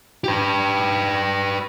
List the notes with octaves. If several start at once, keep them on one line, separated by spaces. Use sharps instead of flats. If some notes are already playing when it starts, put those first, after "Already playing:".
G4 B4